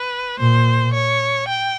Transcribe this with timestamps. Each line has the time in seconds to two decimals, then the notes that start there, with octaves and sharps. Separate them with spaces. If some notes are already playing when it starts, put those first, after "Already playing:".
Already playing: B4
0.40 A#2 C5
0.94 C#5
1.48 G5